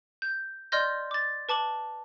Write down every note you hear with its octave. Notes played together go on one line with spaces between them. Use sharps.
G6
D5 D#5 C6 F6 G6 A#6
D6 A6
B4 A5 D6 F#7